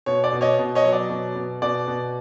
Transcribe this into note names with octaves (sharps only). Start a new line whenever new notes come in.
B2 C#5
D5
B2
C#5 D#5
B2
C#5 D#5
F#3
D5
B2
B2
B2 D5
B2